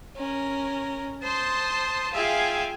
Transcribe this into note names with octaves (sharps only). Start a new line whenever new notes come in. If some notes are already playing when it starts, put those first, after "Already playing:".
C#4 A#4
C5 A5 C6 D#6
F4 G#4 E5 F5 G5 G#5